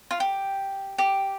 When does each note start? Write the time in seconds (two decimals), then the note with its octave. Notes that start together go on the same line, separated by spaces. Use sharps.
0.11 F4
0.20 G4
0.98 G4